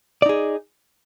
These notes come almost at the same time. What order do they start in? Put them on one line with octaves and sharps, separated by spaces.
D5 D#4 G#4